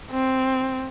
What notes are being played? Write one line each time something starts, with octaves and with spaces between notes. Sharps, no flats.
C4